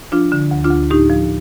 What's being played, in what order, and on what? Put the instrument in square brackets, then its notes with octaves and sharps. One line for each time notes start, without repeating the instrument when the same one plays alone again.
[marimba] F3 D4 F4
D3
D2
D4 F4
D2
A2 D#4 G4
F3